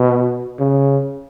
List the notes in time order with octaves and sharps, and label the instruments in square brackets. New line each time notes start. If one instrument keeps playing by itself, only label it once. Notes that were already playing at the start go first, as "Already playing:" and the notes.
Already playing: [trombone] B2
C#3